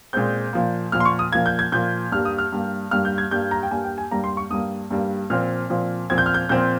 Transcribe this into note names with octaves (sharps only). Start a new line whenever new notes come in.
A#2 G#3 C4 G6
A#2 F3 A#3
A#2 F3 A#3 F6
C6
C#6
D#6
A#2 F3 A#3 G#6
G6
G#6
A#2 F3 A#3 G6
G2 G3 A#3 F6
D#6
F6
G2 G3 A#3
G2 G3 A#3 F6
G6
G#6
G2 G3 A#3 G6
A#5
G5
G2 G3 A#3 G#5
G5
G#5
G2 G3 A#3 A#5
C6
C#6
G2 G3 A#3 D#6
G2 G3 A#3
A#2 F3 C4 F6
A#2 F3 C4
A#2 F3 C4 G#6
G6
F6
G6
A#2 F3 C4 G6